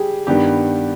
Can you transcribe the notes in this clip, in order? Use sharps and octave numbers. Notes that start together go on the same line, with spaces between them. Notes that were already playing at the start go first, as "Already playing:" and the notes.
Already playing: G3 G4 G#4
G2 D#3 G3 B3 G4